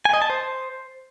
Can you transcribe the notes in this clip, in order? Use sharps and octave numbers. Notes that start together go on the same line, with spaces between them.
G#5
D#5
A5
C5